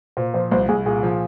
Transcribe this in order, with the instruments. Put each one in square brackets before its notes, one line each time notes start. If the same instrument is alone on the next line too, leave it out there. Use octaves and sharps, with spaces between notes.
[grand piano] A#2 [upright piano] C5
[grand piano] F3 [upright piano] C5
[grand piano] C2 [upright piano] C5
[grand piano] C2 [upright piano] G#4
[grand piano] A#2 [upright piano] G#4
[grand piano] F3